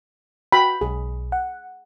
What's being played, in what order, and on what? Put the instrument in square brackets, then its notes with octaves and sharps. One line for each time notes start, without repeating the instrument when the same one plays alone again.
[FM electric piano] F#4 G5 [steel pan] B5
[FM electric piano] B1 [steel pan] G#4
[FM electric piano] F#5